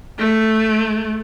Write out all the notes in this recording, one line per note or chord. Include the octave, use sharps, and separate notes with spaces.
A3